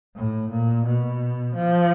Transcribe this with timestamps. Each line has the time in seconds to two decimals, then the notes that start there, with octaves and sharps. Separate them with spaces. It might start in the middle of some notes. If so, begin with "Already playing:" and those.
0.15 A2
0.50 A#2
0.85 B2
1.55 F3